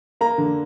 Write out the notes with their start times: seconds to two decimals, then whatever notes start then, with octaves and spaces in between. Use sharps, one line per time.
0.21 A#3 A#5
0.38 D3